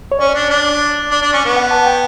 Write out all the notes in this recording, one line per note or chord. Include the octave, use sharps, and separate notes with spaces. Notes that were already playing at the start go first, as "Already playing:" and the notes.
C#5
C#4 D5
D4
D4
D4
D4
C#4
B3
F#5
A5
G5